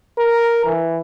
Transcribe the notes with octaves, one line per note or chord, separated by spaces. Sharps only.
A#4
E3